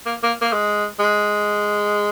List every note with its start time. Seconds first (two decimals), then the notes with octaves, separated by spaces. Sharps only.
0.06 A#3
0.23 A#3
0.41 A#3
0.53 G#3
1.00 G#3